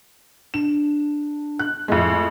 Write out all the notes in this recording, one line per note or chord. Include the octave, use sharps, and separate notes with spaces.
D4 E7
F#6
F2 A2 G#3